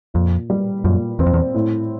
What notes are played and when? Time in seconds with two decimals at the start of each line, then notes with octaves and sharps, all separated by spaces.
0.14 F2 A#2
0.50 G3
0.84 F#2 A#2
1.19 E2 C4
1.26 F2
1.33 E2
1.54 A2